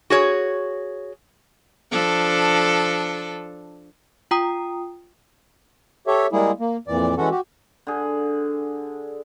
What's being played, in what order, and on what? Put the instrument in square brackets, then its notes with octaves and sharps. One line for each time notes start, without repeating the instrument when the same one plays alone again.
[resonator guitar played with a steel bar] F#4 G#4 C#5
[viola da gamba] F3 D4 A4
[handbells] F4 G5 A#5 D#6
[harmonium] G4 A4 C#5 E5
G3 G#3 A#3 E4 G#4
A#3
F2 A#2 E3 D5
E3 G#3 C#4 F#4 A4 F#5
F#4 G4
[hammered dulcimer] D3 G#4